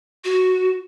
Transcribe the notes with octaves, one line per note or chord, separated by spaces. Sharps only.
F#4